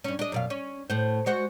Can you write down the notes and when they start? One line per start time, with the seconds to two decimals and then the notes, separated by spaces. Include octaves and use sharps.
0.04 G2 C#4
0.19 D4 D#5
0.32 F#2 B2 F5
0.50 C#4
0.90 A2 C5
1.26 G#3 F#4 C5